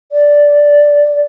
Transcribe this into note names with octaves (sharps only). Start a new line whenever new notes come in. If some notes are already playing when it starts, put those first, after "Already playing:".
D5